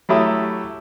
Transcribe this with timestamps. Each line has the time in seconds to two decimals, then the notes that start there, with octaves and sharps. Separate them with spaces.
0.09 F#3 A3 E4 G4 D#6